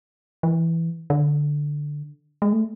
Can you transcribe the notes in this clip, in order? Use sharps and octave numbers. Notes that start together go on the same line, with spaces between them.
E3
D3
G#3
A3